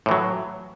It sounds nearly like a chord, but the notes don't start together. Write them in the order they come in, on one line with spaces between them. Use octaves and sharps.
A2 E3 F#3